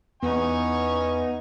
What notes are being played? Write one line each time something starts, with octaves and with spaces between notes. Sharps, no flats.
E2 B3 D#4 G#5 C#6